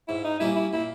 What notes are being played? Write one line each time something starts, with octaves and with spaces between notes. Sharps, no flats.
G#2 E4
D#4
G3 A#3 C#4 E4
E4
A#2 E4